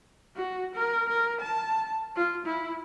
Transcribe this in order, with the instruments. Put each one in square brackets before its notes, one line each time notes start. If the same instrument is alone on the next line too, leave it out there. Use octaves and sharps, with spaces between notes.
[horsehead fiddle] F#4
A#4
A#4
A5
F4
E4